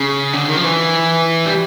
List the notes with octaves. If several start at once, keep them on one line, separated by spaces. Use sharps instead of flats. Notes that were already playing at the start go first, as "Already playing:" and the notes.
Already playing: C#3
D3
D#3
F3
E3
G3